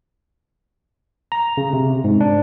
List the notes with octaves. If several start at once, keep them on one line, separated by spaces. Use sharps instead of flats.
A#5
C#3
C3
G#2
D4